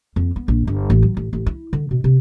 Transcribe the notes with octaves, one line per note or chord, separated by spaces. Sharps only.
F2
B3
A#1
G1
A1
F#3
A1
A1
E4
D3
B2
C3